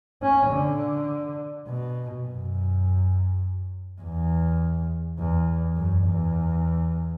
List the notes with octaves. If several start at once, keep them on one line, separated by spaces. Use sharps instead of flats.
C#4
D3
B2
F#2
E2
E2
F#2
E2